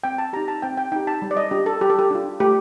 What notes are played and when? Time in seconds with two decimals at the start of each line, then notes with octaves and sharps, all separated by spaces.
0.04 C4 G5
0.18 A5
0.33 D#4 G4 A#5
0.48 A5
0.62 C4 G5
0.77 G5
0.92 D#4 G4 G5
1.07 A5
1.22 G3
1.31 D5
1.37 D#5
1.51 D4 F4 G4
1.66 A4
1.81 G3 G4
1.90 A4
1.99 G4
2.11 D4 F4
2.40 A3 G4